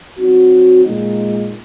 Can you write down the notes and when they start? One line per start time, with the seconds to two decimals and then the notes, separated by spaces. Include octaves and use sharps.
0.18 F#3 C4 D#4 F#4
0.84 A#2 G#3 D#4